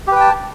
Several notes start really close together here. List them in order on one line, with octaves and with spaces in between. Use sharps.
G4 B4 G5 A5